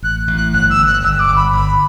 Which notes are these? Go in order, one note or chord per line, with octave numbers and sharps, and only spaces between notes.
A1 F#6
A1
F#6
G1 F#6
E6
G1
F#6
G1 E6
E6
D6
G1
B5
G1 B5